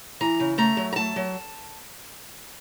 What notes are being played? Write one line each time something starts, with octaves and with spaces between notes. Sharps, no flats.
E3 A#5
C#3
A3 A#5
F#3
A#5
A3 A5
F#3